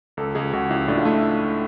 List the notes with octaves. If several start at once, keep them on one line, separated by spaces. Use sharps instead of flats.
C#2 A4
C#2 G#4
C#2 F#4
C#2 E4
A2 D4
F4
A3 E4